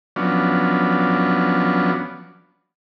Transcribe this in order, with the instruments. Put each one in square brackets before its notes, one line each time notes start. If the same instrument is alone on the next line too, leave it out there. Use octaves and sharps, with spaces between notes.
[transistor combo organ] F3 F#3 B3 C#4 D4